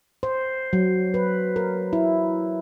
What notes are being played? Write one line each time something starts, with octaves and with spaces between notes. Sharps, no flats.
C5
F#3
B4
A#4
E4